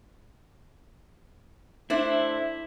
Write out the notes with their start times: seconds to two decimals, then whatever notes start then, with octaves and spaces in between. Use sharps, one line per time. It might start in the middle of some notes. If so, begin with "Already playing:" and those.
1.90 A3 D4 E4 C5